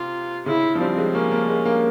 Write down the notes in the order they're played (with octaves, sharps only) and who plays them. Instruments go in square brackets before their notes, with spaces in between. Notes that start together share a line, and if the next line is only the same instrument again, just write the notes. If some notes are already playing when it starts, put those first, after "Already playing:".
Already playing: [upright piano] C3 [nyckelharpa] F4
[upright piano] C#3 [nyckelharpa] E4
[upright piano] F3
[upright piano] G3 [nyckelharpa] C4
[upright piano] G#3
[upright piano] A#3 [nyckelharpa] C#4
[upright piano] A#3
G#3
A#3